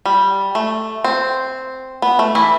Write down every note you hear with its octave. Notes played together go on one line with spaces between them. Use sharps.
G3
A3
C4
B3
A3
E3 E4